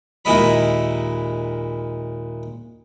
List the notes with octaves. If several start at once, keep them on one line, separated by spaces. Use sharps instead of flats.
D#2 A#2 G#3 E4 D#5 B5